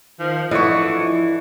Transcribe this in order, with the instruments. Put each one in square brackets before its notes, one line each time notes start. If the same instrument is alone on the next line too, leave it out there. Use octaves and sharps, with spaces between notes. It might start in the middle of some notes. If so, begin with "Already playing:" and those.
[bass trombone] D#3 [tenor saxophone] F3
[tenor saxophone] D3 [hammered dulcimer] E3 C#6 [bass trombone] F3 [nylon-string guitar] D#5
[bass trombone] E4